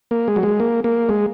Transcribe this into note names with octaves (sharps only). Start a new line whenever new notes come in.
A#3
G#3
F#3
G#3
A#3
A#3
G#3